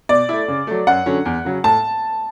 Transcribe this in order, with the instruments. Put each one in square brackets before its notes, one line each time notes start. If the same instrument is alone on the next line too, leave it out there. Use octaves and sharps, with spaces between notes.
[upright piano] B2 [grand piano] D5
[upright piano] A3 E4
C#3
F#3 A3
[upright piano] F#2 [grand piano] F#5
[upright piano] D3 F#3 C#4
E2
C#3 F#3
[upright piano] A2 [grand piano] A5